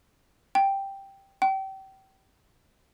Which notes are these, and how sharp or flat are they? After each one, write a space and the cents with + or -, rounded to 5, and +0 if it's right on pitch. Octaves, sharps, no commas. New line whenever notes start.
G5 +0
G5 -30